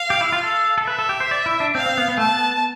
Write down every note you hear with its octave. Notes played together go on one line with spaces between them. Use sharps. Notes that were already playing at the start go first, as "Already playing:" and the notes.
Already playing: F5
G4
E4
F4
A4
A4
B4 E5
A4
G4
C5
D5
E4
D4
C4 F5
C4
B3
B3
A3 A5
B3